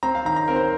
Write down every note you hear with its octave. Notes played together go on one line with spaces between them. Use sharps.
C4 A#5
F5
D#3 A#5
A#5
C4 A#4
C5